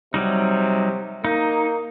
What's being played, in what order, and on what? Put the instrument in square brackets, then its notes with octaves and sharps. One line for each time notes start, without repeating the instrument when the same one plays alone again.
[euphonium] C3 [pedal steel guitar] F#3 G3 D#4
[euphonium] A#3 [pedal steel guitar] D#4